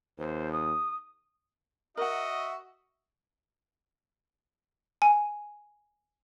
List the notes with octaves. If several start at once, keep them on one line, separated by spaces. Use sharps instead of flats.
D#2 C5
D#6
F#4 A#4 D#5 E5 F#5
G#5